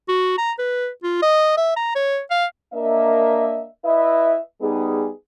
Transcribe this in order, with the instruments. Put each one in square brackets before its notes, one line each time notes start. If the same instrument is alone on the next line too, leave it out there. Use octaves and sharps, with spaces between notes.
[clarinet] F#4
A#5
B4
F4
D#5
E5
A#5
C#5
F5
[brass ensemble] A#3 D4 A#4 D#5 E5
E4 B4 D#5 E5
G3 B3 D#4 G#4